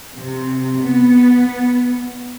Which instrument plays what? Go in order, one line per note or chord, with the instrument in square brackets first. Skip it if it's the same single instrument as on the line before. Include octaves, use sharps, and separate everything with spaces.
[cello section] C3
B3